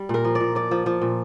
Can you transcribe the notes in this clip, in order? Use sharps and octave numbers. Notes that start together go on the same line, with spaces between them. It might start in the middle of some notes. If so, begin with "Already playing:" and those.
Already playing: G3
A#2 A#4
F3
D5
A#2
F3 D5
F3
F3
A#2